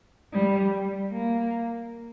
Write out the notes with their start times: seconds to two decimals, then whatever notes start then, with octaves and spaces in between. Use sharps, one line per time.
0.33 G3
1.12 A#3